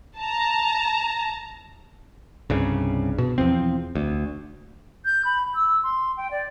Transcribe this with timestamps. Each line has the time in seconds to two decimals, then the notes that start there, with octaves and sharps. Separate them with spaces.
0.17 A5 A#5
2.50 C2 G2 C#3
3.18 B2
3.38 E2 F3 C4
3.95 D2
5.05 G6
5.25 B5
5.55 E6
5.83 C6
6.17 G5
6.31 D5